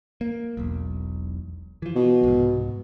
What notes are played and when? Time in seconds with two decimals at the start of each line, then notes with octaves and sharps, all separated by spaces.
0.21 A#3
0.57 E1 B1
1.82 E3 F3
1.96 B2
2.24 C2 G#2